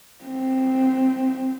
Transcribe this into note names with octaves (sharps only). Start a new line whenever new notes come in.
C4